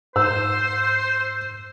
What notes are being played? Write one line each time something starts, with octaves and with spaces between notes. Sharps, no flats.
G#2 C5 E6